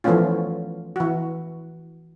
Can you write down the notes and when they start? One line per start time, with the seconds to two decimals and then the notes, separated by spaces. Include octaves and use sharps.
0.04 E3 F3 A3 B3 C#4 F4
0.96 E3 F#4